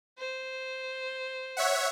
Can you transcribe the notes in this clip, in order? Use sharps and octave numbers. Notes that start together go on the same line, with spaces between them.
C5
C#5 E5 F#5